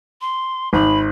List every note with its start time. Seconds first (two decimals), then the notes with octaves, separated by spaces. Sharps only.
0.21 C6
0.73 G#1 B5